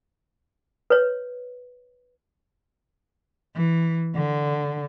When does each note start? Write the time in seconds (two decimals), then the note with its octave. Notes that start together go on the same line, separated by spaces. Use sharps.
0.90 B4 C#5
3.56 E3
4.16 D3